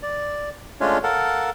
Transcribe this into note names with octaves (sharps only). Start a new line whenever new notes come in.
D5
G#3 A3 C#4 D4 F4 C#5
A4 A#4 F5 F#5 A5